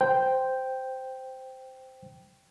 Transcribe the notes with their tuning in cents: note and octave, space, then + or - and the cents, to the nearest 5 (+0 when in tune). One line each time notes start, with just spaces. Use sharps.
C5 -5 G5 +0